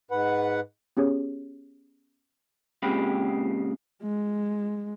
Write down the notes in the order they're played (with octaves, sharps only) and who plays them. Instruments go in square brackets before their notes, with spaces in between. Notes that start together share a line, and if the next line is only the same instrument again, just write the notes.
[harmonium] G#2 B4 F#5
[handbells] B3 C#4 G4 G#4 C#5
[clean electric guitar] A#2 C#3 G#3 C4 G4 B5
[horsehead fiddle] G#3